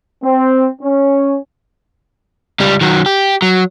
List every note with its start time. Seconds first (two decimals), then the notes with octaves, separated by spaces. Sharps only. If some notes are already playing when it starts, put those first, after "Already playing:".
0.23 C4
0.82 C#4
2.60 C#2 G3
2.81 D#3 F#3
3.06 G4
3.42 F#3